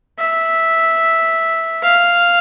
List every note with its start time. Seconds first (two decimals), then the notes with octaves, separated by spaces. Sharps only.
0.19 E5
1.84 F5